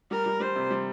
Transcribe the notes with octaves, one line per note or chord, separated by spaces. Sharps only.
G3 A#4
G3
G3 C5
C3
G3